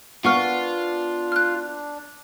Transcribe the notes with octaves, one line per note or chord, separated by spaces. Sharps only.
B3 D4 F4 A#4 F5 F#5 C#6 F6
F6 F#6